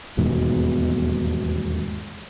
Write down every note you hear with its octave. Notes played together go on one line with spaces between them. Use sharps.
D#1 E2 G#2 B2